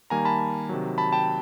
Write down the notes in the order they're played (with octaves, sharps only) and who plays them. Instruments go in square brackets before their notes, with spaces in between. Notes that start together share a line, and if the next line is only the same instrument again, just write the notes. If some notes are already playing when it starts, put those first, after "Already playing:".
[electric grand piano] D#3 G3 A#3 G#5 A#5
A5 B5
C3 D#3 F#3
A5 B5
G5 A5